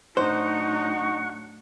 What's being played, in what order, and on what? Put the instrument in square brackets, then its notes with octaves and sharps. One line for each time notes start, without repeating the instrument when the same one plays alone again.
[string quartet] A2 F#3 D4 [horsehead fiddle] D#4 [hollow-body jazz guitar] C5 [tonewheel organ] F#5 C#6